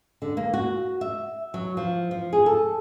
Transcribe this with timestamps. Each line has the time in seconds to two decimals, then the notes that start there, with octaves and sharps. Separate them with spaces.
0.22 D3
0.37 A#3
0.54 F#4
1.01 E5
1.54 F#3
1.77 F3
2.11 F3
2.33 G#4
2.46 A4